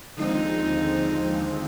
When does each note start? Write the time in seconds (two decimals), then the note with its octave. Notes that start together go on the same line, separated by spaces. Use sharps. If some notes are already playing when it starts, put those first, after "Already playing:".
0.17 D#2 D3 F3 G#3 C4 D#4